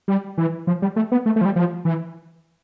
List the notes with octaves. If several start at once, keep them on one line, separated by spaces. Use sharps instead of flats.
G3
E3
F3
G3
A3
B3
A3
A3
F3
G3
F3
E3